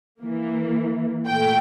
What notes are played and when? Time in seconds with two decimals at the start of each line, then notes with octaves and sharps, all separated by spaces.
0.20 E3 A#3
1.27 A#2 A3 G5